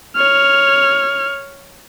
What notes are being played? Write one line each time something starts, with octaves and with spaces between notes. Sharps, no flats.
C#5 F6